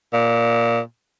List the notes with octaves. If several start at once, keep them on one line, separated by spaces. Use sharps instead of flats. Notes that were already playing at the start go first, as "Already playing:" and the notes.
A#2